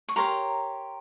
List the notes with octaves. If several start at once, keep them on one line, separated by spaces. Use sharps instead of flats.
C#6
G4 A#4 C#5 A#5 C6